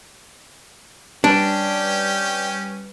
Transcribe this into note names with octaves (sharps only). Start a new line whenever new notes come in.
G3 C#4 D4 G4 B4